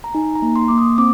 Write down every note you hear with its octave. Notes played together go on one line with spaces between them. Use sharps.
A#5
D#4 G#5
A#5
A#3
C6
A#3 D6
D#6
C4 D6